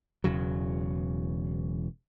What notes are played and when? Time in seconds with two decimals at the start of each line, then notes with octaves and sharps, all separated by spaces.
0.24 E1 E2 C#3 F#3